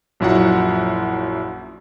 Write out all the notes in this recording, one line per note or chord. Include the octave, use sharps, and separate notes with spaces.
A#1 F#2 F#3 E4 F4 F#5